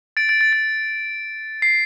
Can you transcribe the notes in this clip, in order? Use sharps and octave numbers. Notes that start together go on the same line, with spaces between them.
A6 D7
A6 D7
A6
A6
C7